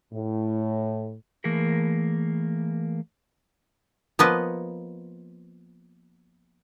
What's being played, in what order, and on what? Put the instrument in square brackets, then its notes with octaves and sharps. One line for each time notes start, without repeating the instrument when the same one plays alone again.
[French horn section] A2
[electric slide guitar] E3 A3 A#3 G#4 A#4
[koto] F3 A#3 B3 B4 D#5